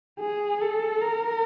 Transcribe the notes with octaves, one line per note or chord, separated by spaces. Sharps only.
G#4
A4
A#4